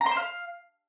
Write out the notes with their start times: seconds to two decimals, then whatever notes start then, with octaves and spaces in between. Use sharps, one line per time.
0.01 A#5
0.06 C6
0.11 C5
0.17 F5